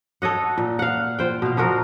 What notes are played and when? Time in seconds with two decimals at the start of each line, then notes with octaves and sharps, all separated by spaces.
0.22 A4 C#5 D#5 F#5
0.58 A#2
0.79 F5 F#5
1.19 F4 C5 G5
1.42 B2 F5
1.57 A#2 F3 F#4 A#4